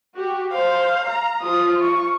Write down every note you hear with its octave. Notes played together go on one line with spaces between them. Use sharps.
F#4 G4
C5 F5
A#5
F3 F4 D#6
C#6